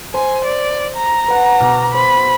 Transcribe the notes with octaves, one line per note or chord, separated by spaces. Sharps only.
C5 G#5
D5
A#5
B4 F#5
B2 D6 F6
C5 B5